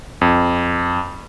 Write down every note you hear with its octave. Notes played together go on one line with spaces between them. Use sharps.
F2